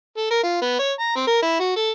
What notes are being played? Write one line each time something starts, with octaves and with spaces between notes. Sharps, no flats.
A4
A#4
F4
B3
C#5
A#5
C4
A#4
E4
F#4
A4